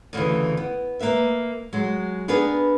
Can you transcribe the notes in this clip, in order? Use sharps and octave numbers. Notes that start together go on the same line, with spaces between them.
D2 C#3 E3
B3
A#3 B4 E5
F#3 G#3
B3 D4 G#4 A#4 B4